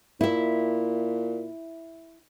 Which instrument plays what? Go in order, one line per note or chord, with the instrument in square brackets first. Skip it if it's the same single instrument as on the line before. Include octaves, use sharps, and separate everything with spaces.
[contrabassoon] A#2 [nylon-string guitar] E4 E5